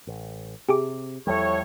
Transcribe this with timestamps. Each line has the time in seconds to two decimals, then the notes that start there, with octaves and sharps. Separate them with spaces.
0.07 A1
0.69 C3 G4 G#4 D6
1.27 E2 A2 F3 G3 C#5